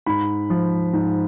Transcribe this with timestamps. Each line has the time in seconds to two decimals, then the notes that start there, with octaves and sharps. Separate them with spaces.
0.06 G#2 B5
0.50 F3
0.93 G#2